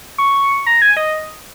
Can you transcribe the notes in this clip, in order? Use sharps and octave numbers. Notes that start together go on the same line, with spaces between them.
C#6
A#5
G#5
D#5